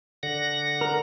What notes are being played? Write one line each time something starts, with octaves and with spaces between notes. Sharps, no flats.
D3 F#5 A#6
A#4